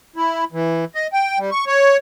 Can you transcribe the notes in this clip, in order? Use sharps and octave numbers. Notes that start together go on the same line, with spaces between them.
E4
E3
D#5
G5
G3
C#6
C#5